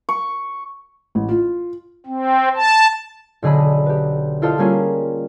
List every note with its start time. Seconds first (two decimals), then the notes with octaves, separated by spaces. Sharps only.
0.09 C#6
1.15 A1
1.29 F4
2.06 C4
2.56 A5
3.42 B1 D3 G#4 D#5 B5
3.86 G4 B4
4.42 E4 F4 A4 C5 D#5 F5
4.58 G3 A#3 C#4 F4 G#4